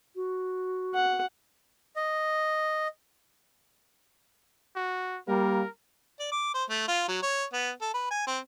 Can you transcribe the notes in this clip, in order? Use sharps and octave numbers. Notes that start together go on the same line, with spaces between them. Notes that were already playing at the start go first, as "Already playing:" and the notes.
F#4
F#5
D#5
F#4
G3 A#3 A#4
D5
D6
C5
A3
F4
F#3
C#5
B3
A4
B4
G#5
C4